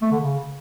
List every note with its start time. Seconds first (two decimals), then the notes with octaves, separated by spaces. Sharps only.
0.02 A3
0.11 D3
0.20 C#3